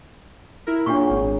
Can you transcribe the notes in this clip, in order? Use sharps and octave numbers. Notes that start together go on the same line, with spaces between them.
E4 A#4
A#2 F#3 D4 G4 G#4 C#6
G#1